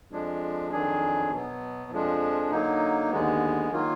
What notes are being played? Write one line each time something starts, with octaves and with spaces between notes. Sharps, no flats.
F2 F3 G#3 D4
F2 D#3 F#3 D4 G#4
B2 F#3 B3
F2 F3 G#3 D4
D3 F#3 A#3 D#4
D#2 D3 G#3 B3
D#3 F#3 A#3 F4